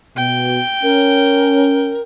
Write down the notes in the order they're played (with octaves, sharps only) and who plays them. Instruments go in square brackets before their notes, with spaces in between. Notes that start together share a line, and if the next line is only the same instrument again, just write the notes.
[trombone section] B2 [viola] G5
[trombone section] C#4 [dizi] A#4